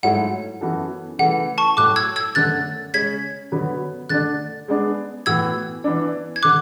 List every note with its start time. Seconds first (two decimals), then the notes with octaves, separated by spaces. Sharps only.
0.03 G#2 F#3 A3 E4 F#5
0.61 F#2 E3 B3 F#4 A4
1.19 C#3 E3 A3 F#5
1.58 A5 C#6
1.77 A2 F#3 A3 D6 F#6
1.96 E6 G#6
2.16 E6 G#6
2.35 F#2 D3 A3 F#6 A6
2.93 C#3 G#3 C#4 G#6 B6
3.52 D3 F#3 B3 F#4 B4
4.09 D3 A3 D4 F#6 A6
4.68 G#3 B3 D4
5.26 A2 E3 B3 F#4 E6 G#6
5.84 E3 B3 D4
6.36 G#6
6.43 D3 D6 F#6